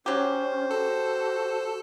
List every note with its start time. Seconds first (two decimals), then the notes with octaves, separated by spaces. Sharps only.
0.06 F#3 C#4 G4 C5
0.71 F#4 A4